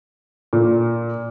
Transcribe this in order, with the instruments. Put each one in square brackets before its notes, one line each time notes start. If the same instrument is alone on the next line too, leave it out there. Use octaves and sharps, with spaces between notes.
[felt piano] A#2